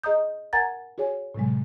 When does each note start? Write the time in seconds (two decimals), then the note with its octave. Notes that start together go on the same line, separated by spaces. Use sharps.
0.03 G#4 D#5 A#5 D#6 G6
0.53 A#4 F#5 G#5 A#5 G#6 A6
0.98 F#4 G#4 C#5 G#5
1.35 A2 C3 F#3 G#3